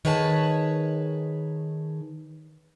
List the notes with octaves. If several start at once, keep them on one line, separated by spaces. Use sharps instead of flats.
D#3 G#4 B4 C#5 E5 A5